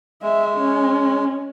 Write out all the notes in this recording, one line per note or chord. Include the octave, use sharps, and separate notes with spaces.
G#3 E5
C#4